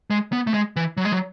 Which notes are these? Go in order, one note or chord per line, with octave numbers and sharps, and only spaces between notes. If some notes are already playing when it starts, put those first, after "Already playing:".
G#3
B3
A3
G#3
E3
F#3
G#3
F#3